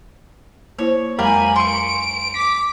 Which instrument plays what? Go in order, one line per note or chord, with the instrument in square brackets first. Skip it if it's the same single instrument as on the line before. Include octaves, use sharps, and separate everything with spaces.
[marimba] A#3 E4 C5 [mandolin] C#5
[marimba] F2 F#3 G#3 [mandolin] G4 A#4 F5 [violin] G#5 B5
[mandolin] C6 C#6 [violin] D7
[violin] D6 B6